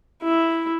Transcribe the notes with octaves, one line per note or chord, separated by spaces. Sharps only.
E4